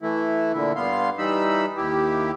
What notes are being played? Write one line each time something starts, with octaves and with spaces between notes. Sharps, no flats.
E3 A3 E4
A#2 D3 E4
G2 B3 F5 C6
E3 G3 D#4 B5 E6
D#2 E4 G4